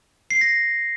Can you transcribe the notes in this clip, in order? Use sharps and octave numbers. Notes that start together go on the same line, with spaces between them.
C7
A#6